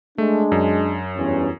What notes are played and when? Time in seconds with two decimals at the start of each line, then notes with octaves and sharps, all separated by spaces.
0.18 G#3 A3 D4
0.52 F#2
1.17 E2 G2 C#4